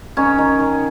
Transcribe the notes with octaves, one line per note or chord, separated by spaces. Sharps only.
D#3 C#4
D#3
D#3